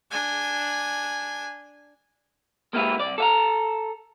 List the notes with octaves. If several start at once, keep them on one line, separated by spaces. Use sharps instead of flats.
D4 G#5
G#3 A#3 B3 E4 G4 B4
C2 D5
A4 F5 A#5